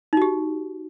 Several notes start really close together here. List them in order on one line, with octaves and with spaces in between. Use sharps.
D#4 F#4 G4